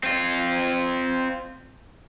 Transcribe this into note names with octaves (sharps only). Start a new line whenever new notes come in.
C4 F4